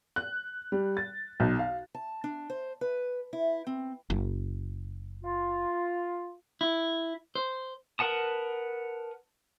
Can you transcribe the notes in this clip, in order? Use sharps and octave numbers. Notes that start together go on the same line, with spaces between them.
F#6
G3
A6
B1
F5
A5
D4
C5
B4
E4
C4
F#1
F4
E4
C5
A#4 B4 F#5 A5 D#6